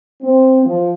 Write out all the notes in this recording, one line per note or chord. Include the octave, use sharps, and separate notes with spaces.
C4
F3